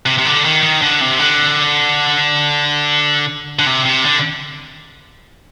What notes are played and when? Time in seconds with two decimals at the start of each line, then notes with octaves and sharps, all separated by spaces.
0.06 C3
0.18 C3
0.25 D3
0.44 D#3
0.63 D#3
0.82 D3
1.01 C3
1.19 D3
3.59 D3
3.67 C3
3.85 C3
4.05 D3